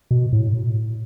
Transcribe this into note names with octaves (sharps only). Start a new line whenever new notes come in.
B2
A2